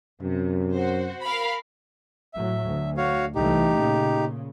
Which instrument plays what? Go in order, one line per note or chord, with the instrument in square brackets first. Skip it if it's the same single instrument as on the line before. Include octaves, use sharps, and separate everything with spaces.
[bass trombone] F#2 [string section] C3
[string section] F#4 C5
A#4 F5 B5
[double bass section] A2 F#3 [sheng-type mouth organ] E5
[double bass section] D2
[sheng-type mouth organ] F#4 C#5 F5
[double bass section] C2 E3 A3 [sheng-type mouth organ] D#4 G4
[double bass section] A#2 C#3